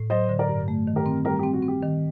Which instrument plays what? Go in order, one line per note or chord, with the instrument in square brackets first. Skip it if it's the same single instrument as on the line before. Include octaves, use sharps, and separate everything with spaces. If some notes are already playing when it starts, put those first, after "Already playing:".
Already playing: [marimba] A2
[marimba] F#3 [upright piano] C5 D#5
[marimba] D3
[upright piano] A#4 D5
[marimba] G2
A3
D#3
[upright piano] G4 A#4
[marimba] C4
[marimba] G3 [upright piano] G4 A#4
[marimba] C4 [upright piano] G4
[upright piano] F#4
[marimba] C4
[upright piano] G4
[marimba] D#3